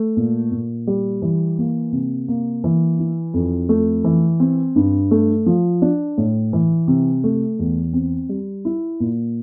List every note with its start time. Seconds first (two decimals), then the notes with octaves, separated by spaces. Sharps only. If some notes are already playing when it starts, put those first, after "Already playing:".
Already playing: A3
0.17 A#2
0.52 A#2
0.87 G3
1.22 E3
1.58 A#3
1.92 C3
2.28 A#3
2.64 E3
2.99 E4
3.34 F2
3.69 A3
4.04 E3
4.40 C4
4.76 G2
5.11 A3
5.46 F3
5.82 D4
6.18 A2
6.53 E3
6.88 C3
7.24 A3
7.59 E2
7.93 C4
8.29 G3
8.65 E4
9.00 A#2